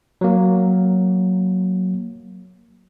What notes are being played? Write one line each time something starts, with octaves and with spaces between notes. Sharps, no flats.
F#3 A#3